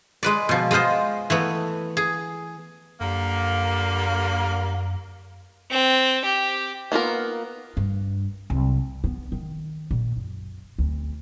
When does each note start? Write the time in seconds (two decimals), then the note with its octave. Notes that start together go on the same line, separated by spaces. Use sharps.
0.23 G#3 B4 D5
0.49 B2 F3
0.71 G#3 B3 F4 C5 D#5
1.30 E3 A3 B3
1.97 G#4
3.00 F#2 D3 G3 A#3
5.71 C4
6.25 G4
6.92 A#3 B3 F4 A#4
7.77 G2
8.50 C2 F#3
9.04 B3
9.32 D#3
9.91 A#1
10.17 F#2
10.78 D2 C4